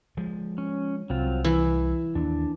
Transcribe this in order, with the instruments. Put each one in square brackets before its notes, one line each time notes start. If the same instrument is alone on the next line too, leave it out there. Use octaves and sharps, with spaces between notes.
[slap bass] F3 G#3
[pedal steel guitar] C#4
[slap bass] C2 [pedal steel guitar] F#3 C4 F4
[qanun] E3 [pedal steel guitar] E6
[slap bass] D#2 [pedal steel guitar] D4